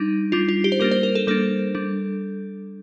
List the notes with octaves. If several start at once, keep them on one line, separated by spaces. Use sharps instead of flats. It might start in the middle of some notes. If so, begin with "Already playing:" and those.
Already playing: G3 D4 D#4
G3 D4 F4
F4
G4
C5
G3 A#3 D4 A#4
C5
A#4
A4
G3 A#3 D4 A4
G3 D4